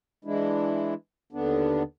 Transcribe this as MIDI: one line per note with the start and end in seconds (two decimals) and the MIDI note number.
0.25 0.94 52
0.25 0.94 56
0.25 0.94 62
0.25 0.94 64
1.33 1.83 39
1.33 1.83 50
1.33 1.83 59
1.33 1.83 62